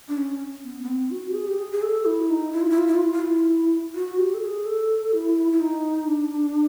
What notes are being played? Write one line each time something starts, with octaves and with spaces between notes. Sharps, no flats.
D4
C#4
B3
B3
C4
F#4
G4
G#4
G4
G#4
G#4
A4
E4
D#4
E4
F4
E4
F4
E4
F4
E4
F4
E4
F#4
G4
A4
G#4
A4
E4
E4
D#4
D4